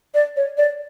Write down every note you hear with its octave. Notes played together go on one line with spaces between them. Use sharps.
D5
C#5
D5